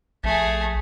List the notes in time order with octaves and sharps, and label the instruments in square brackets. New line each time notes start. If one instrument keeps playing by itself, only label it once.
[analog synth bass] A#1 [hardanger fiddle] A3 G#4